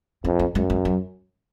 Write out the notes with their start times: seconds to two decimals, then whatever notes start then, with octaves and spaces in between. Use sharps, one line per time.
0.24 F2 C#4
0.39 C4
0.55 F#2 G#3
0.70 G#3
0.85 F#3